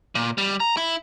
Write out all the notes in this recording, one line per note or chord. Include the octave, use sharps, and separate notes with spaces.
A#2
G3
A#5
E4